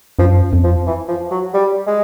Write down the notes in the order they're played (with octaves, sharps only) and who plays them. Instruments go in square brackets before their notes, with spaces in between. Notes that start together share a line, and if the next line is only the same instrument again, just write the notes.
[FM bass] F#2 [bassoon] F3
[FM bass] F2
[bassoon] F3
E3
F3
F#3
G3
G#3